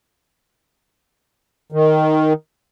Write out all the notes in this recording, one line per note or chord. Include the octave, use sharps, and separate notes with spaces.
D#3